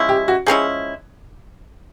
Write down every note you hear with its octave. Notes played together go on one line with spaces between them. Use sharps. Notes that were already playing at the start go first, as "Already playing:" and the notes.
Already playing: F3 G#3 C#4 E4
G4
F#4
F3 G#3 C#4 E4 G#4